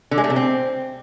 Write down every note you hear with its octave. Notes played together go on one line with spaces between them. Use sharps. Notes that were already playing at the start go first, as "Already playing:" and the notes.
D3
G#3
A3
C3
C4